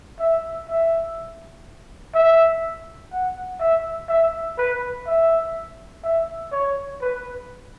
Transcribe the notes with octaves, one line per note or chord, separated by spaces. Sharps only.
E5
E5
E5
F#5
E5
E5
B4
E5
E5
C#5
B4